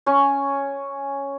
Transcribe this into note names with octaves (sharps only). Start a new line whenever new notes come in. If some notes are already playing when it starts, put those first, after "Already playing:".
C#4 G#5 C#6